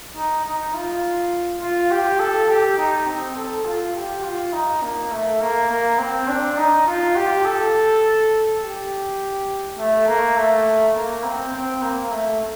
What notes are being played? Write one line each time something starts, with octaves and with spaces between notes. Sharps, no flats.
D#4
D#4
F4
F4
G4
A4
G4
D#4
C4
A4
F4
G4
F4
D#4
A#3
A3
A#3
A#3
C4
D4
D#4
F4
G4
A4
G4
A3
A#3
A3
A#3
C4
C4
A#3
A3